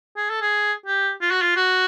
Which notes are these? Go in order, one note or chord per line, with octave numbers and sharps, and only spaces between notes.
G#4
A4
G#4
G4
F4
F#4
F4
F#4